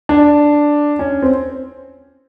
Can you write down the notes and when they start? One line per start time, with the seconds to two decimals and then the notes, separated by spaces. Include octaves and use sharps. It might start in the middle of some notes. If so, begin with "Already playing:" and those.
0.09 D4
0.99 C#4
1.22 C4